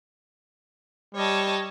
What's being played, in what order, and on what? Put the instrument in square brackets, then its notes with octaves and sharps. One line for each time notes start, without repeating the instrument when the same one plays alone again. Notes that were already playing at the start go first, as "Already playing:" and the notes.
[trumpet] G3 [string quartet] C#5 D#5 A5